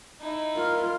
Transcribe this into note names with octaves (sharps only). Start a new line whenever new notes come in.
D#4 E4
F4 A#4